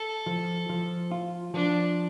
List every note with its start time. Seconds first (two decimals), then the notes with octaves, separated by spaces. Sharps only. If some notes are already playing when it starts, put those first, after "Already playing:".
Already playing: A4
0.26 F3
0.69 F3
1.12 F4
1.54 F3 D4